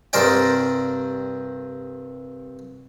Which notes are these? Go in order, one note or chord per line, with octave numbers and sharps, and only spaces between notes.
C2 G2 A#4 C5 D5 G5